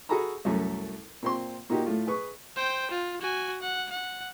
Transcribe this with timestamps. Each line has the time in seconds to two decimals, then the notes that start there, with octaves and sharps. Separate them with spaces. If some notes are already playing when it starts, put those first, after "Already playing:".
0.09 F#4 G#4 A4 A#5 B5
0.45 C2 F#2 A3 C#4
1.23 A#2 C4 C6
1.70 A#2 A#3 D#4 F#4 G4
1.86 A2 A3 F4
2.07 G#4 B4 C#6
2.56 C5 G5
2.91 F4
3.21 F#4 G#5
3.61 F#5
3.91 F#5